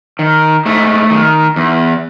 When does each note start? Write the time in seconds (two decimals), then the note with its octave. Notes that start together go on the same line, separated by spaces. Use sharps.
0.19 D#3
0.66 G#2 A3
1.10 D#3
1.56 E2